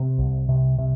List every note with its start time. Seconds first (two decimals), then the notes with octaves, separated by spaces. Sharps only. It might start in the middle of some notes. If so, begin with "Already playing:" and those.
Already playing: C3 C4
0.18 C2
0.49 C3
0.78 C3